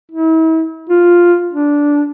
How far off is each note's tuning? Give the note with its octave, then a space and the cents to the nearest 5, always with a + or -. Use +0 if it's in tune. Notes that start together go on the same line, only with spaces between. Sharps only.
E4 -40
F4 +0
D4 -10